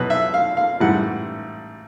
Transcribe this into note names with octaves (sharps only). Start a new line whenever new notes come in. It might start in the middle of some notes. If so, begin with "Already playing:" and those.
Already playing: E2 B2 F#3 B4
E5
F5
F5
A1 G#2 E3 G3 F#5